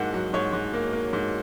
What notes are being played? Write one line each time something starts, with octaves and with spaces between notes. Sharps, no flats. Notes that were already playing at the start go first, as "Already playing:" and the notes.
Already playing: G#2 F#3 A#3 D#4 F#5
F#3
G#2 C#5
G#2
A#3
A#3
G#2